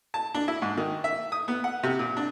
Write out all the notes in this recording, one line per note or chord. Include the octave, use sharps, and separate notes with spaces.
A5
D4
E4
G#2
D#3
E5
D#6
B3
F#5
C3
A#2
D4